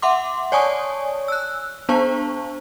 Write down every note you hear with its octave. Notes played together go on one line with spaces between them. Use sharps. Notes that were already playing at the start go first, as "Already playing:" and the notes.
E5 F#5 C6 D6
C#5 D5 G#5 A5 C#6 D#6
E6 F#6
B3 D4 C5 A5 C#6